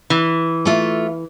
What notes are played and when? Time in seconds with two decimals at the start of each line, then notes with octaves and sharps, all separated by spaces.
0.10 E3
0.65 A3 F4 E5